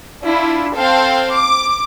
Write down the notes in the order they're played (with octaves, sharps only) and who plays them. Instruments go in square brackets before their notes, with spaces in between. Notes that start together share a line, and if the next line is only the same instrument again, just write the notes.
[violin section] D4 E4 F4
C4 A4 C5 F5 G5
D6